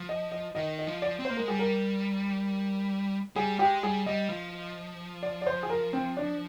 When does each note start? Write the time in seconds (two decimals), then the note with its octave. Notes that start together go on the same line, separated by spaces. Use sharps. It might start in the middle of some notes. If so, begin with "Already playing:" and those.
Already playing: F3
0.09 D#5
0.32 D#5
0.55 D#3 D#5
0.79 D#5
0.87 F3
1.02 D5
1.19 C4
1.25 A#3 C5
1.37 G#3 A#4
1.48 G3 G#4
1.59 A#4
3.36 G3 G#4
3.59 G#3 G4
3.83 G3 G#4
4.06 G3 D#5
4.29 F3
5.23 D5
5.42 D5
5.47 C5
5.63 G#4
5.70 A#4
5.93 C4
6.17 D4